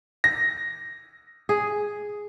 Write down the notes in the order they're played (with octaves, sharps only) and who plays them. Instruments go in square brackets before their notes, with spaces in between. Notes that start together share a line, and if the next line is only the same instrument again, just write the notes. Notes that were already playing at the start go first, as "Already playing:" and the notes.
[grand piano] A#6
[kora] G#4